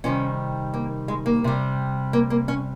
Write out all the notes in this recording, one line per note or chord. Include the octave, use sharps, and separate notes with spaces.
C3 D#3 G3 C#4
A#3
G#3
A#3
C3 G3
A#3
A#3
C#4